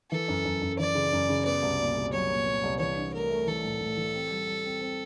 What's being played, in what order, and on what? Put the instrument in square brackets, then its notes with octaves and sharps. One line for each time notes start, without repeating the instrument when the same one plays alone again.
[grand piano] E3 [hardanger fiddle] A4
[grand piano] F#2
F#2
F#2
[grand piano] E3 [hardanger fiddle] D5
[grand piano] C#3
F#2
C#3
[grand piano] B3 [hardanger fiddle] D5
[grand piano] C2
A#2
C2
[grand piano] F#3 [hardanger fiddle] C#5
[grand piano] A#2
A#2
C2
[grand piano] E3 [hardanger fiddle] C#5
[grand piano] D4
[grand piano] A3 [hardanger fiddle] A#4
[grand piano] A3
[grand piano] E3 [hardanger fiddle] A4
[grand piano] A2
A2
E3
C4
G3
G3
C4
C4